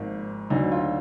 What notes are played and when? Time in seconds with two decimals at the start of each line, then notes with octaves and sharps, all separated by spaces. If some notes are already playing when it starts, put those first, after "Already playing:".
Already playing: G#1 G#2 F3 A#3
0.50 D2 D3 F#3 D#4
0.72 F4